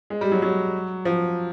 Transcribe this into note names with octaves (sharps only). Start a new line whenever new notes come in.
G#3
G3
F#3
F#3
F3